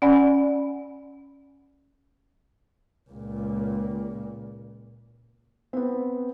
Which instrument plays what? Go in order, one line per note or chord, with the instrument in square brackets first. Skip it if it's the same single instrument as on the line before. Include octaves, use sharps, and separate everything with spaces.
[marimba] C#4 D5 F#5 G#5 B5
[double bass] C#2 A#2
[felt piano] B3 C4